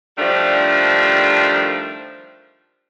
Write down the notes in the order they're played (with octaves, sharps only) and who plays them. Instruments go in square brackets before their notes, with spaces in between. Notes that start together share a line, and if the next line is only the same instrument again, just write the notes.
[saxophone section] D#3 F3 G3 A3 D4